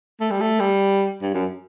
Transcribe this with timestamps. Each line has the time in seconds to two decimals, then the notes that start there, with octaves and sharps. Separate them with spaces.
0.20 A3
0.31 G3
0.41 A3
0.60 G3
1.22 G2
1.34 F#2